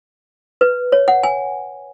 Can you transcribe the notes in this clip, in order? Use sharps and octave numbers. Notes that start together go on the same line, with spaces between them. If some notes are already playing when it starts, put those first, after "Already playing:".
B4
C#5
F#5
G#5